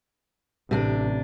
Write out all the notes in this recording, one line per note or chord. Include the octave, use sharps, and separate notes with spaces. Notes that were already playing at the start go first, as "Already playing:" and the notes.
A1 C3 D4